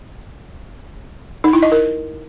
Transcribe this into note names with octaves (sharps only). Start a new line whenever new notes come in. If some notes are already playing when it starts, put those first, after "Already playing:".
D#4
E4
D#5
A#4